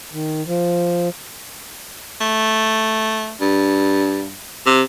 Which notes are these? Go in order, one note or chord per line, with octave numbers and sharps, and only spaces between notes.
D#3
F3
A3
G2
C3